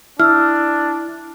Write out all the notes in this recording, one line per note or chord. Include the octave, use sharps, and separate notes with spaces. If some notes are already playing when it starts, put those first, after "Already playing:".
D4 E4 E6 F6